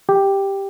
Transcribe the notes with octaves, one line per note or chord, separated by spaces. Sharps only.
G4